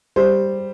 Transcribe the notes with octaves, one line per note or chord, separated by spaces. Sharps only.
G3 C5